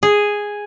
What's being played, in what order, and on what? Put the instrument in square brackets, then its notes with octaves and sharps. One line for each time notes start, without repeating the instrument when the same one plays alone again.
[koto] G#4